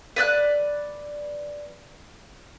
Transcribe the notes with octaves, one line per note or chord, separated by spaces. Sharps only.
B4 D5 E5 F#6